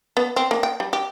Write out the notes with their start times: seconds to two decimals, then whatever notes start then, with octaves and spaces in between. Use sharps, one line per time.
0.17 B3
0.36 C4
0.51 A#3
0.63 G5
0.80 G3
0.93 G4